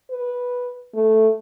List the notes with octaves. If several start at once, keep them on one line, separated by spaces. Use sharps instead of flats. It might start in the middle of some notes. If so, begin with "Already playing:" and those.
B4
A3